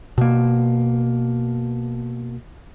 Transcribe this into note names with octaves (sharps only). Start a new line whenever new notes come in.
B2 A#3